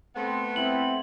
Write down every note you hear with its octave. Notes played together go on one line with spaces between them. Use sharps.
A3 B3 C4
C4 E4 F#7